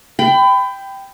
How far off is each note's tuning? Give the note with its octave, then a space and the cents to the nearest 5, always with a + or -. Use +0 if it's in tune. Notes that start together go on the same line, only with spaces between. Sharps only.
G5 +0 B5 +30